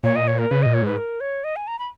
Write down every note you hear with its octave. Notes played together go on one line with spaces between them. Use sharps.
A#2 C#5
D#5
C#5
A#4
C#3 B4
A#2 D#5
C#5
G#2 B4
A#4
C#5
D#5
G#5
A#5
B5